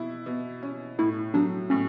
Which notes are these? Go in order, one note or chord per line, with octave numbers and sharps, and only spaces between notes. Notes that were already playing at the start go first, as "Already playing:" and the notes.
Already playing: B2 E4
B2
C#4
A2 E4
F#3 D4
A2 C#4